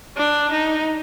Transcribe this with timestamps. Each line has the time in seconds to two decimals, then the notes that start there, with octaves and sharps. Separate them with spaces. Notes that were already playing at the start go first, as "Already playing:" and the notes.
0.17 D4
0.52 D#4